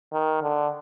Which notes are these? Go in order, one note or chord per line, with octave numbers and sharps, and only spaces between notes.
D#3
D3